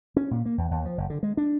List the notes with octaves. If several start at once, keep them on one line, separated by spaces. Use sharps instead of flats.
C#4
A#2
A#3
E2
D#2
F3
F#1
D3
G#3
D4